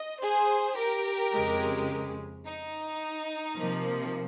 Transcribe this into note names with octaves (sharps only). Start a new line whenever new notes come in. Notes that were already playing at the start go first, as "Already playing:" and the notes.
Already playing: D#5
G#4 C5
G4 A#4
F2 C#3 G#3
D#4
C3 F3 A#3